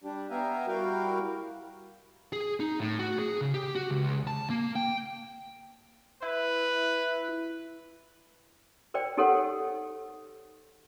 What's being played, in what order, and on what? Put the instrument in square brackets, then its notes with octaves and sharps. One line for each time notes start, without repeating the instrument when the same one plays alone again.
[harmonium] G3 D4 G4
B3 E5 F5 G5 G#5 A#5
G3 E4 F#4 A#4 F5 G5
[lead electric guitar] G#4
D#4
A2
F#4
G#4
C#3
G4
F#4
C#2
A5
A#3
G5
[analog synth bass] E4 [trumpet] B4
[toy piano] A#4 C5 D5 G5
D#4 G4 A4 A#4 C#5 F#5